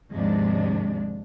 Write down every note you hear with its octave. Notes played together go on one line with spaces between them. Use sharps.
D#2 G#2 C3 F3 G#3 D4